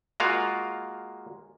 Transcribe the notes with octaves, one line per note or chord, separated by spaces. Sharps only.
G#3 A#3 F4 F#4 F5